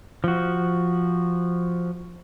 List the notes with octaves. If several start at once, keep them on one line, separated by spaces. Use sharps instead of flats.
F3 F#4